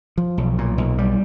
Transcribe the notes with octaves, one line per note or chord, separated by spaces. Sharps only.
F3
B1
A#2
B1
G3